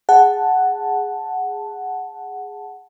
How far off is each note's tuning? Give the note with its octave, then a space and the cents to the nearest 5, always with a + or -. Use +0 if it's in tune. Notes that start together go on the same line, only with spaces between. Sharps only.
G#4 -5 F#5 +0 A5 +0